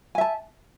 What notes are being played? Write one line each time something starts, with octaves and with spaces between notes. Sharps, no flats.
E5 G#5 A5